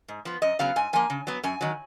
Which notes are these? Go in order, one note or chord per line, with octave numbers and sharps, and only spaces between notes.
G#2
F3 B3
F#2 D#5
C#3 F#3 B3 F5
G#2 G#5
F3 A#3 G#5
C#3
F#3 B3
F#2 G#5
D#3 F#3